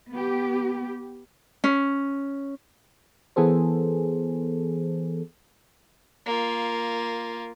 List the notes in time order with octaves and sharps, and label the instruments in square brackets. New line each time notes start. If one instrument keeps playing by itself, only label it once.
[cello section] B3 G4
[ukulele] C#4
[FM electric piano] E3 B3 G#4 A4 C5
[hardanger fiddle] A#3 F4